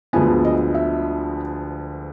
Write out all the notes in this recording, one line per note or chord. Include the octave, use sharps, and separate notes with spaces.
D2 D3 F3 G#3 B3 G#5
D#5
E5